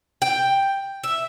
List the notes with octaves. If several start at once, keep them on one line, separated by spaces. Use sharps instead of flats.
G5
E5